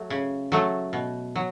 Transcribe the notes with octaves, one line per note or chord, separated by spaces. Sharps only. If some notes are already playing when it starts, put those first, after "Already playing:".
Already playing: F#3 A3
C#3
F#3 A3
B2
F#3